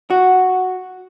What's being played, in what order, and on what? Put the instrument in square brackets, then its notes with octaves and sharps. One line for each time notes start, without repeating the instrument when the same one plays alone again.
[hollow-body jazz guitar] F#4